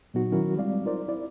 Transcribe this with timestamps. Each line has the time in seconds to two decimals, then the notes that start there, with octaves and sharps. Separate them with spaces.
0.14 A#2 F#3 B3 D#4 F#4
0.32 D#3 F#3 C#4 E4 F#4 A#4
0.56 G3 G#3 C4 D5 F5
0.85 D#4 F4 A#4 C5 D5
1.08 E4 D5